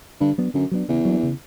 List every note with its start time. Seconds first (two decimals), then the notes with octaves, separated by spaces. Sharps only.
0.20 G2 D3
0.38 F#3 B3 D4
0.54 F#2 D3
0.71 F#3 B3 D4
0.88 E2 C#3
1.05 F#3 A#3 D4
1.23 C#3